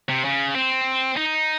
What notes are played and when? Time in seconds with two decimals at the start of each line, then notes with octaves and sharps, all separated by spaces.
0.09 C3
0.25 C#3
0.55 C4
1.17 D#4